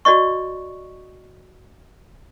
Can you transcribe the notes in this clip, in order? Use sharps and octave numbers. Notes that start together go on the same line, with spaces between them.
F#4 D5 D#5 C#6